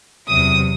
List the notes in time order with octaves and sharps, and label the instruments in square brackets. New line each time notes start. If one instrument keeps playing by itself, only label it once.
[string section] E2 C3 F#3 D#6